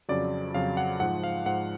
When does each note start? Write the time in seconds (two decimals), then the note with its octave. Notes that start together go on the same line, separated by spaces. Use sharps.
0.09 F2 C#3 F#3 D5
0.54 F2 C#3 F#3 F5
0.77 F#5
1.00 G#2 F3 F#5
1.23 F5
1.46 G#2 F3 F#5